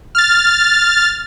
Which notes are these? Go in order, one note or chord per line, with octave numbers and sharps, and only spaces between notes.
F6 A6